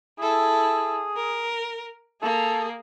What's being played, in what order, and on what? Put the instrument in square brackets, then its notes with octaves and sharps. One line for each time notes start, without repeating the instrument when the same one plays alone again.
[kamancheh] E4 A4 [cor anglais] G#4
[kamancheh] A#4
[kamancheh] A#3 G#4 [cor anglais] A4